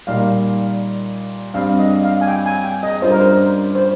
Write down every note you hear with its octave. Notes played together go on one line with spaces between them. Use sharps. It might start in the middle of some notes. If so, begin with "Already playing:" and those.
A#2 G3 A#3 D#4 F5
G2 G3 C4 F5
D#5
F5
G#5
G5
G#5
G5
D#5
G2 G3 C#4 F4 C5
A#4
C5
C5